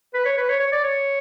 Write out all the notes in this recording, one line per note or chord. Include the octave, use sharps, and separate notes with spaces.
B4
C#5
B4
C#5
C#5
D5
C#5